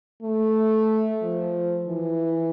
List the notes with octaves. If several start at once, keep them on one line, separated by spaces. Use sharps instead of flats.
A3
F3
E3